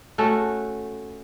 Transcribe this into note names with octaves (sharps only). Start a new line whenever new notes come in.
A3 C#4 F#4 A4